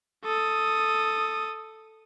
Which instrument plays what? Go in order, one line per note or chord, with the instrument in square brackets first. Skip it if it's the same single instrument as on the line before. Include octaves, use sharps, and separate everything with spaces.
[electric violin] A4 D#6